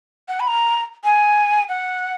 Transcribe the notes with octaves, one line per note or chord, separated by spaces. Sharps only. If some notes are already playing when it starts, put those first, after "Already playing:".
F#5
B5
A#5
G#5
F#5